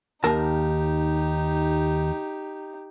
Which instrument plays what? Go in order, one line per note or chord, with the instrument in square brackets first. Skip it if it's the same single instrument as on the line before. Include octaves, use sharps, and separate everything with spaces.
[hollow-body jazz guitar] D#2 A#4 A5 [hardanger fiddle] D#4 G4